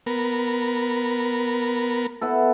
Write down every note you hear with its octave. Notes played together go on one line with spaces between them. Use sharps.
B3 A#4
B3 E4 A4